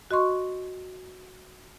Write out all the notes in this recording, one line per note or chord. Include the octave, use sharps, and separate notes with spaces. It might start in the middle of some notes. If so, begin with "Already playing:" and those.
F#4 D#5 C6 C#6